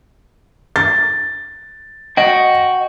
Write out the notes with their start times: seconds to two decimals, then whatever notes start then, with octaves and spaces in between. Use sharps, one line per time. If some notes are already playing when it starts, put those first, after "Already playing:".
0.76 A6
2.17 F#4 D#5 G5